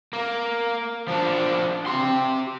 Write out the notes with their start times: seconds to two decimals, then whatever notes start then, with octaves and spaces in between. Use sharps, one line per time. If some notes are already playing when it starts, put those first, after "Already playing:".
0.13 A#3
1.08 F3 D4
1.86 G4 C6